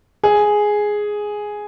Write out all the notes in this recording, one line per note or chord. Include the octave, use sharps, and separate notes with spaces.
G#4